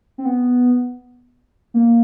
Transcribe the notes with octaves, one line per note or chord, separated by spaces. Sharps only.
C4
B3
A#3